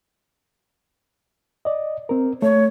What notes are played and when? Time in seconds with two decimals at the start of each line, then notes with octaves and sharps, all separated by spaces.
1.65 D5 D#5
2.09 C4 A#4
2.42 A3 C#5